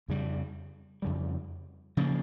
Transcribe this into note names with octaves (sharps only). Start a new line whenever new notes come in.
F2 C#3 G3
F2 C#3 G3
C#3 F3 A#3